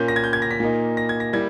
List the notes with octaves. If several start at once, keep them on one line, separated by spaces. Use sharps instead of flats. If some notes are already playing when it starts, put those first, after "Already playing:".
Already playing: A#2 A#3 C#4 G6
A#6
G#6
G6
G#6
A#6
B6
A#2 A#3 D#4
A#6
G#6
A#6
G3 A#3 E4 G#6